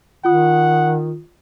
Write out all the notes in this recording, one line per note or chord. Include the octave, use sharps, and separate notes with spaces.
D#3 F4 F#5 D#6